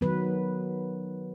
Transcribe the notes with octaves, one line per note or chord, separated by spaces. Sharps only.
D#3 F#3 B3 B4